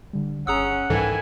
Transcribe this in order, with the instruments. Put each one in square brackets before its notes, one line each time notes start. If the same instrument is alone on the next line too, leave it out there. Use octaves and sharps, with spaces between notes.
[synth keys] D3 G3
[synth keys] G1 G#4 [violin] C#4 [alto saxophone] F#5 [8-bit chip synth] A#5 D#6 E6
[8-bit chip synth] C2 G#2 E3 [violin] E4 G#5 [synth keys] A4 A#4 G5